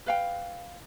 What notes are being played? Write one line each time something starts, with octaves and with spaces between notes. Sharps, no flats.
B4 F5 G5